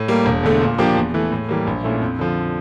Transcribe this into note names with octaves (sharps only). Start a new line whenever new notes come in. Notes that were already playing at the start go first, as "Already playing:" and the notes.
Already playing: A2
G3 A#3
E1
E2 D3 A3
A#2
F3 A#3 D4 G4
E2
E3 A3
A2
E3 G3 A#3
A#1
A#2 A3 C#4 E4
F2
D3 F3